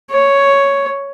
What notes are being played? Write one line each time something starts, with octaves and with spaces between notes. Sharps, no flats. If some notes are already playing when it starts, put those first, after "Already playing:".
C#5